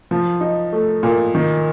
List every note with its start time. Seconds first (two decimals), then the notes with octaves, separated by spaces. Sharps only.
0.11 F3
0.41 D#4
0.73 A3
1.03 A#2
1.35 D#3